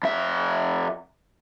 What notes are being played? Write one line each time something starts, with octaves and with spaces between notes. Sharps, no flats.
F2 E5